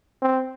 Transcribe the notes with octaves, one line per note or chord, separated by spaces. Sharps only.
C4